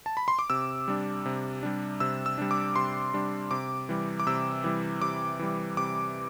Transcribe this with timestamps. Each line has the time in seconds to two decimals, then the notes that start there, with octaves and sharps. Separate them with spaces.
0.06 A5
0.17 B5
0.28 C6
0.39 D6
0.50 C3 E6
0.88 G3 D4
1.26 C3
1.63 G3 D4
2.00 C3 E6
2.26 E6
2.38 G3 D4
2.51 D6
2.76 C3 C6
3.14 G3 D4
3.51 C3 D6
3.89 E3 G3
4.20 D6
4.27 C3 E6
4.64 E3 G3
5.02 C3 D6
5.39 E3 G3
5.77 C3 D6